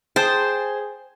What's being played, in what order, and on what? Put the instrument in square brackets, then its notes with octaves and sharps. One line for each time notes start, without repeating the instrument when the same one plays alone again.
[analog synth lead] G#4 [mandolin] C5 A5 [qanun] G5